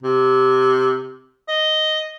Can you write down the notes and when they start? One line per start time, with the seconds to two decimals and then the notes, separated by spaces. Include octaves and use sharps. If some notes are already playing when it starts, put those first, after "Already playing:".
0.03 C3
1.48 D#5